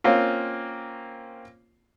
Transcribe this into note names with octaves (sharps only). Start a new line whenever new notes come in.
A#3 C4 C#4 F4